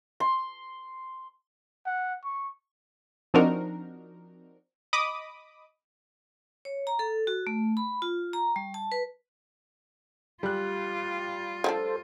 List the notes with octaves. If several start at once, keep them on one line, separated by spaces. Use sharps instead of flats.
C6
F#5
C#6
F3 C4 D4 D#4 F#4 A#4
D#5 B5 D6 D#6
C#5
A#5
A4
F#4
A3
B5
F4
A#5
G3
A5
B4
G3 F4 F#6
F3 C#4 D4 A4 C5